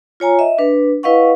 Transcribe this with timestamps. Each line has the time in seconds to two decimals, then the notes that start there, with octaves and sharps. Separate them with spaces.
0.20 F4 C#5 G#5 A#5
0.39 D#5 E5
0.58 D4 B4
1.03 E4 B4 D#5 F5 F#5 C#6